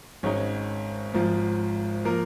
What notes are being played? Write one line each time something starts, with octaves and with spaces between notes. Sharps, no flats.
G#1 G#2 G#3 C#4 D#4 C#5
G#1 G#2 F3
F3 A#3 A#4